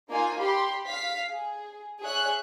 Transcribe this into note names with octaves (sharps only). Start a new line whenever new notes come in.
A#3 D#4 F4 G#5
G4 B5 C6
F5 B6
G#4
G#4 C#5 E5 F#6